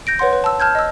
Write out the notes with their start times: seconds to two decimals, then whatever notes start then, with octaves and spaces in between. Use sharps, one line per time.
0.07 G6 A#6 D7
0.19 B4 C#5 F#5 C6
0.33 B4
0.44 A5 E6
0.60 A5 F6 G6 G#6
0.75 D#5 E6